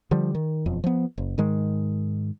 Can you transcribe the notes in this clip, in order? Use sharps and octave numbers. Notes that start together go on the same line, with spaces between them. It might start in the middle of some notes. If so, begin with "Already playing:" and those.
D3 F3 G3
D#3
E1 F2
F3 B3
F#1
G#2 D#3 G#3